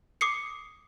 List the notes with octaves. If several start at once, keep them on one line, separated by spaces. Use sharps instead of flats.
D6 D#6 C7 C#7